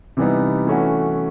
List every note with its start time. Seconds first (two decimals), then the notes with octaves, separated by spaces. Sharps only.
0.17 C3 E3 G3 B3 D#4
0.67 E3 A3 C#4 F#4